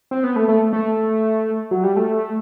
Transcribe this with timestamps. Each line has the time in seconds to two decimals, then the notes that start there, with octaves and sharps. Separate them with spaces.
0.11 C4
0.24 B3
0.36 A3
0.48 A3
0.73 A3
1.71 F#3
1.84 G3
1.96 A3